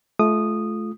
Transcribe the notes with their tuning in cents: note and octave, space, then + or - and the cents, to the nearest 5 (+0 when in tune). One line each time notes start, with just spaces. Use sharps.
A3 -35 F4 -10 D#6 -10